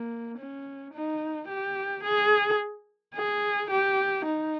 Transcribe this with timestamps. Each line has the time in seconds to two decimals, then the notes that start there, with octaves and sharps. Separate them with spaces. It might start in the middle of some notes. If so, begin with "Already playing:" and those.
Already playing: A#3
0.37 C#4
0.93 D#4
1.48 G4
2.03 G#4
3.15 G#4
3.70 G4
4.25 D#4